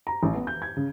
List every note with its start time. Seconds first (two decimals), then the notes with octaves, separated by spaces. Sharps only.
0.07 A#5
0.23 A1
0.35 B3
0.47 G6
0.62 G#6
0.77 C#3